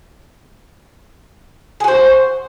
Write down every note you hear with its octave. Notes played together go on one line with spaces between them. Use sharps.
F#4 G#4 C5